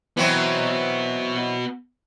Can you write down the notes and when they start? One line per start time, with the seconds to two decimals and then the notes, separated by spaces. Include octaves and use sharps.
0.17 E3 F#3 B3 C4 F#4